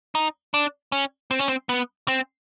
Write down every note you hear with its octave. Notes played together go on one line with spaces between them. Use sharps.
D#4
D4
C#4
C4
C#4
C4
B3
C4